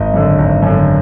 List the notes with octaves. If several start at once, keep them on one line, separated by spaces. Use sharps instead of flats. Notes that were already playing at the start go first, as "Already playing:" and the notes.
Already playing: G#1 D#5
F#2 D3
G#1
F#2 D3